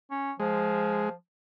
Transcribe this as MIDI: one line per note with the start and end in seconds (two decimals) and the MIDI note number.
0.10 0.32 61
0.40 1.12 53
0.40 1.09 56